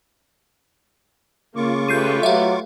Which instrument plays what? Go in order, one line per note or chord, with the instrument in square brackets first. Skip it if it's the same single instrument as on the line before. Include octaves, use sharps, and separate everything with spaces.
[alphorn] C#3 [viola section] A#3 [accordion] F4 C#6 D6
[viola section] A3 G4 B4 [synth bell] G6 C7 D#7
[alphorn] F#3 [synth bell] E5 F5